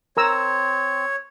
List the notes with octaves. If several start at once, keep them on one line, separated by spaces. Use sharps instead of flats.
C4 A#4 C#5 A#5 E6